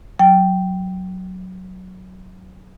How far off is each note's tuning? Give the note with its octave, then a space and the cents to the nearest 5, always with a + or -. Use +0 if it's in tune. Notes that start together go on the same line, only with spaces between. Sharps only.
F#3 +0 G5 -5